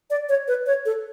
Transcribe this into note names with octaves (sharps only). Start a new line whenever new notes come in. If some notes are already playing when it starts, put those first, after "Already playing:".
D5
C#5
B4
C#5
A4